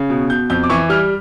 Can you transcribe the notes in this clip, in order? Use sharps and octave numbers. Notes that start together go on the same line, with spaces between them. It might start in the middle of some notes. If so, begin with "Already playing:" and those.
Already playing: C#3
B2
B2 G6
F2 G6
D6
E3 C#6
G3 F6